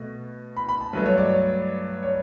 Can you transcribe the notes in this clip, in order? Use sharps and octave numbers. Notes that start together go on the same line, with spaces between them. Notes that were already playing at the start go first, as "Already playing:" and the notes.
Already playing: B2 A3
B5
B5
A5
G2 F#3 A3 B4
C#5
D5
C#5
C#5